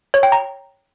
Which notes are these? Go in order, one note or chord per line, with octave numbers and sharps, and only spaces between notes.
C#5
G5
A#5